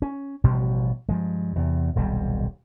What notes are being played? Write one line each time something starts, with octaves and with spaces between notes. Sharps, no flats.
C#4
A1 B2 F3 G3
G2 F3 G#3
E2 C3
D#1 B1 C3 G3